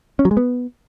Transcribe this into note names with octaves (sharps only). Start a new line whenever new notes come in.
C#4
F#3
G#3
B3